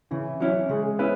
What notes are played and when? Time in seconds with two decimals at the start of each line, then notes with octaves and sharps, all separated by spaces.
0.11 C#3 E3 E4
0.40 F#3 C#4 E4
0.69 C#3 G#3 G#4
0.99 B3 C#4 E4 B4